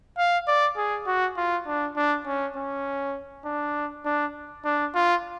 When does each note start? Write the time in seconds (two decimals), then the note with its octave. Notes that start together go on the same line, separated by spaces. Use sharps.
0.18 F5
0.48 D5
0.77 G#4
1.07 F#4
1.37 F4
1.67 D4
1.96 D4
2.26 C#4
2.56 C#4
3.45 D4
4.05 D4
4.65 D4
4.95 F4